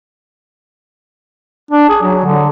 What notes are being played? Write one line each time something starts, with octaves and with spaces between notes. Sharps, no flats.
D4
G#4
F#3
D3